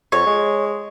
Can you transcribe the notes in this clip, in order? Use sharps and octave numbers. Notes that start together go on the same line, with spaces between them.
F2 C#5
G#3